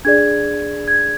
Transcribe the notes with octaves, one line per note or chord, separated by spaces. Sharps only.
D4 G#4 D5 G#6
G#6